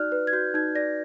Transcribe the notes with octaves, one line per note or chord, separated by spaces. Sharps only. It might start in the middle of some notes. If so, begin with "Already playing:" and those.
Already playing: D#4 F#4 D5 F6 F#6
B4
G#6
F#4 G6
D#4 G#6
D5 A#6